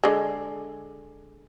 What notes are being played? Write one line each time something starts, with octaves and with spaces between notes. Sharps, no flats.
D3 G#3